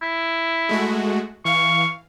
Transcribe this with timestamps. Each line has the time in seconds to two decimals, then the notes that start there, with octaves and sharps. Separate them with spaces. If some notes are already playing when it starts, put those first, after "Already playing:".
0.02 E4
0.69 G#3 A3 F#4
1.45 E3 F5 C#6